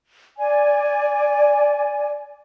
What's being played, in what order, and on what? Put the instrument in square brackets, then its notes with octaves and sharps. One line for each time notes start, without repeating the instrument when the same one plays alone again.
[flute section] D5 G#5